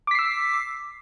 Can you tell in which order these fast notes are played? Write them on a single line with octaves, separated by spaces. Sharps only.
D6 B6 C7 E6